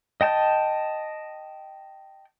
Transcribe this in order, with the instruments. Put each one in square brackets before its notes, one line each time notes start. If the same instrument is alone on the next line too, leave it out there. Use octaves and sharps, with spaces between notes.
[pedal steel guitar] D#5 G5 A5 G6